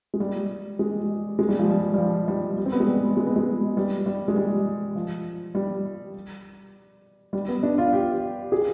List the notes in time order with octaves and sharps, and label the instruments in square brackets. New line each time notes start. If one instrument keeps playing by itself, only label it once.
[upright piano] G#3
G3
G#3
G#3
G3
F3
G3
G3
F3
G3
G3
C4
B3
G#3
G3
G#3
B3
G#3
G3
G3
G#3
G3
F3
G3
G3
B3
D4
F4
G4
G#4